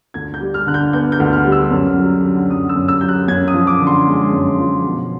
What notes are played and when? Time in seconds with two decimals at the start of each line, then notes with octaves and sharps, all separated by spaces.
0.14 D2 G#6
0.34 G6
0.41 G3
0.54 F6
0.67 D3 F#6
0.74 G6
0.93 B3 G6
1.12 G6
1.20 D2
1.33 F6
1.45 G3
1.52 E6
1.71 F#2
1.98 F#3
2.24 D3
2.50 F#2 D#6
2.69 E6
2.76 F#2
2.88 E6
3.01 F#3 G6
3.08 F#6
3.28 F#2 G#6
3.48 D#6
3.54 F3
3.67 D6
3.80 D3
3.87 C6
4.07 G#3
4.33 F#2
4.59 F3
4.85 B2